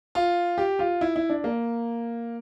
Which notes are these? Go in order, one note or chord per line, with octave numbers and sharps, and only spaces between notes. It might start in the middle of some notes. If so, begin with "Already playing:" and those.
F4
G4
F4
E4
E4
D4
A#3